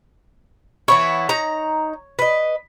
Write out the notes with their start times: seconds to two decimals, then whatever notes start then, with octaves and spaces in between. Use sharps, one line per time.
0.88 E3 B3 E4 C#5
1.29 D#4 A#5
2.19 B4 D#5